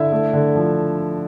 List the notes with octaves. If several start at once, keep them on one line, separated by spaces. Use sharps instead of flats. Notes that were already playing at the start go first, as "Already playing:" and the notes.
Already playing: D3 E4 E5
A3
D3
F3